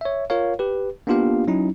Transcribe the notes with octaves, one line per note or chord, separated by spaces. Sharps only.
C#5 E5
F4 A#4 C#5 F5
G4 B4
A#3 B3 D4 F4 G4 F5
F#3 C#4 D#4 E4